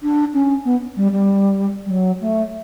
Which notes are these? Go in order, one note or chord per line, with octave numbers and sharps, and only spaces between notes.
D4
C#4
B3
G3
G3
G3
F#3
A3